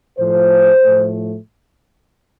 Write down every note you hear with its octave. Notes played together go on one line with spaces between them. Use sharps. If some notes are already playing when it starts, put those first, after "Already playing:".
A2 F3 A3 C5
A2 F3 A3